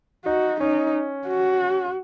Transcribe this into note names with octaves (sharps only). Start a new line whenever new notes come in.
D#4 F#4
C#4 D#4
F#4